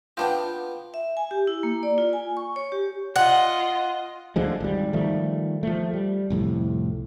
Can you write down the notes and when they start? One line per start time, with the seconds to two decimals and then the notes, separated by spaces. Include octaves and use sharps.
0.17 B3 C4 D4 F4 G5
0.94 E5
1.17 G#5
1.31 G4
1.47 E4
1.63 A#3
1.83 D5
1.98 F4
2.13 G#5
2.37 C#6
2.56 C#5
2.72 G4
3.16 F4 D#5 F#5
4.36 D2 D3 F3 G#3
4.61 G#1 G3
4.93 D#3 F3 G3 A3
5.63 F3 A3
5.94 G3
6.30 C2 F2 A2